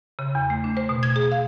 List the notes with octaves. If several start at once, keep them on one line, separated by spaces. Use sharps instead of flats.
C#3
E2
A3
D4
C5
B2
G#6
G#4
F5